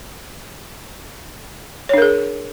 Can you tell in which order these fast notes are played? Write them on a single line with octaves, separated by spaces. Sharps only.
C#5 D4 A#4 G#4